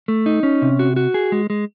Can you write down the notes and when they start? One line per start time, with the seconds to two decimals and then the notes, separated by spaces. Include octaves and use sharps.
0.08 A3
0.26 D#4
0.43 C#4
0.62 C3
0.79 F#4
0.96 F#4
1.14 G#4
1.32 G#3
1.50 G#3